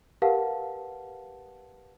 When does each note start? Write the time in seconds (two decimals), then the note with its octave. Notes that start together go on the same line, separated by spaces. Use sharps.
0.22 G4 A#4 B4 F5 F#5 A5